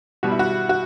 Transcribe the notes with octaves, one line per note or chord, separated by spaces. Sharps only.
B2 G3 F#4
E4
F#4
F#4